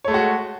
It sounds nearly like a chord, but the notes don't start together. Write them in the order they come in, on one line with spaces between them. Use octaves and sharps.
C#5 A3 G#3 F#4